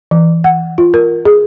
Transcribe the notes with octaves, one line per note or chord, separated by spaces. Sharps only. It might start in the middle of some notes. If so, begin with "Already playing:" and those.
E3
F#5
F4
A#4
G#4